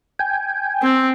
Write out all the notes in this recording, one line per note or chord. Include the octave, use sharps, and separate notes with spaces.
G5 G#5
C4